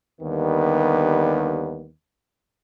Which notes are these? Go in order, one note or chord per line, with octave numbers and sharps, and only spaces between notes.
D#2 D3 D#3 G3 B3